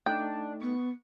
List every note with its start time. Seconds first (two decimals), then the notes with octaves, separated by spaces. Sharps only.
0.06 A3 D4 D#4 G5
0.61 B3 C#6